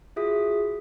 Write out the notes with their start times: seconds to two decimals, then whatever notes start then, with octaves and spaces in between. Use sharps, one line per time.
0.16 F4 F#4 G#4 E5 D#6 B6